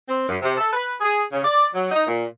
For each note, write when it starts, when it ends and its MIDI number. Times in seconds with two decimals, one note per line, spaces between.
0.09 0.25 60
0.28 0.37 42
0.42 0.52 48
0.57 0.71 69
0.73 0.93 71
1.01 1.24 68
1.32 1.43 49
1.45 1.66 74
1.74 1.91 54
1.91 2.02 63
2.07 2.25 46